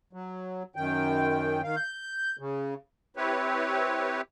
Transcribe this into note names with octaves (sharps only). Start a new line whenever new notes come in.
F#3
F#2 D#3 G5
D#3 F5
G6
C#3
C4 E4 G4 B4 C#5